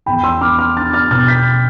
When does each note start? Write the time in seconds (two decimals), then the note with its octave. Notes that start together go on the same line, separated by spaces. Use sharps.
0.06 E2 G5 B5
0.24 C6 E6
0.41 B3 D6 F6
0.59 D6 F6
0.76 D4 F6 A6
0.93 F6 A6
1.11 B2 F6 A6
1.28 G6 B6